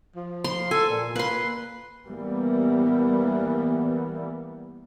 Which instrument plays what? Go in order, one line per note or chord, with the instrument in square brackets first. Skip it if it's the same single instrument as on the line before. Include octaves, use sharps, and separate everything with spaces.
[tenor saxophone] F3
[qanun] C6
[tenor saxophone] A4 [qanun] G#5
[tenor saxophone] A#2
[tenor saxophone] A#3 [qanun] B4 C6
[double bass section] E3 G3 A#3 B3